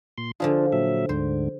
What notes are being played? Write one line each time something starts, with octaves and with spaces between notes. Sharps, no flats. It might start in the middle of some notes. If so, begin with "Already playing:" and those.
A#2 C6
D3 F3 D4 F4 G#4
A#2 F#3 E5
D2 G#2 D3 C5